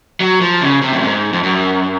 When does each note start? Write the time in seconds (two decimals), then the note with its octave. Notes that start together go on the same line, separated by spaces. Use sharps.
0.20 F#3
0.41 F3
0.61 C#3
0.81 C3
0.92 F#2
1.02 G#2
1.33 F2
1.43 F#2